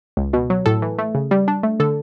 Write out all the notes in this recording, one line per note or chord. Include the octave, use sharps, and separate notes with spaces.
C#2
B2
F#3
A2 A4
E3
A3
C#3
G3
D4
A3
D3 A4